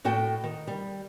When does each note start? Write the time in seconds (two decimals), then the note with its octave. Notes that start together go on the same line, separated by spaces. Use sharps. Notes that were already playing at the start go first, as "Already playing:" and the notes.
0.05 A2 F#4 A4 G5
0.44 D#3
0.67 G3